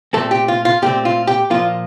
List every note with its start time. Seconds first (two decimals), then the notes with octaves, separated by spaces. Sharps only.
0.13 A#2 A3 C4 A4
0.31 G4
0.48 F4
0.65 F4
0.82 A#2 A3 C4 G4
1.05 F4
1.27 G4
1.50 A#2 F3 A#3 F4